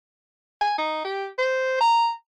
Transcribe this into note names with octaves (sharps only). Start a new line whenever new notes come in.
G#5
D#4
G4
C5
A#5